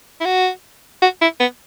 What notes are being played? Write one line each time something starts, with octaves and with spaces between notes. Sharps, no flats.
E4
F#4
F#4
E4
B3